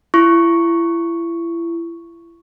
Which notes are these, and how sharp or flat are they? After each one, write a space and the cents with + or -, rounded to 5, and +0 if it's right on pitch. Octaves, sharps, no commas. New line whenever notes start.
E4 +35 C#6 +0